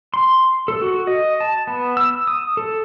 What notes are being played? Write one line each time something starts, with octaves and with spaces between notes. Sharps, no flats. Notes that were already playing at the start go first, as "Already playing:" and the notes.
C6
A4
F#4
D#5
A5
B3
E6
D#6
A4